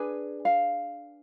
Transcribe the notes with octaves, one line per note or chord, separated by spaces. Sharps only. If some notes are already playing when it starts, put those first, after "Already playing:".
Already playing: D4 G#4 B4 G#5
F5